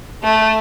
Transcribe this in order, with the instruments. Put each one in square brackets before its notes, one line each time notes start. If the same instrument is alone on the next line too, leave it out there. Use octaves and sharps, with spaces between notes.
[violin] A3